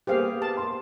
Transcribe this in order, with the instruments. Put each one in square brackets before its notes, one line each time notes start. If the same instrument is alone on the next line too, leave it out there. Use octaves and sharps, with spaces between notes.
[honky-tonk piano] G3 A#3 B3 [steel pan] G4 G#4 F5 [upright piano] C5
[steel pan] A5
[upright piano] C6